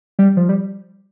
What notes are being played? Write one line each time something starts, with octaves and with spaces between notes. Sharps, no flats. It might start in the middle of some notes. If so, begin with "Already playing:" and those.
G3
F3
G3